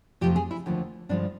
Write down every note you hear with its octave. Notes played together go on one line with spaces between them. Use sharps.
F2 C3 F3 A3 G4
G#4
E4
D#2 D3 F3 A3
G2 D3 F3 G#3 D4